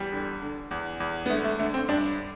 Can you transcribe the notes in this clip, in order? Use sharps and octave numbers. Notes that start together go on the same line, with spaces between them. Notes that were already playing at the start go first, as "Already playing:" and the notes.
Already playing: E2 G3
D3
D3
E2
E2
B3
D3 A3
A3
D3 A3
C4
G2 D4